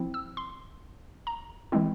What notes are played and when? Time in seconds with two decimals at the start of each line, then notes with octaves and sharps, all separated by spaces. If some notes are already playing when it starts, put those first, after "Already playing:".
Already playing: F3 C4 E4
0.14 E6
0.37 C6
1.27 A#5
1.72 E3 G#3 C4 E4